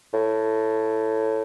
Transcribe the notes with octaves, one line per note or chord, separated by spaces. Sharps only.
A2